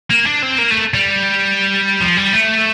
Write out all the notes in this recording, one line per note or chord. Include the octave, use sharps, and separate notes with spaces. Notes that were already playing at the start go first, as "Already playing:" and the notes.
A#3
D4
C4
A#3
A3
G3
F3
G3
A3